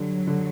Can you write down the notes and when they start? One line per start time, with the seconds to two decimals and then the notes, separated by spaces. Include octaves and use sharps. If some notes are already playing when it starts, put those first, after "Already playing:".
Already playing: D3 F#3 G3
0.27 D3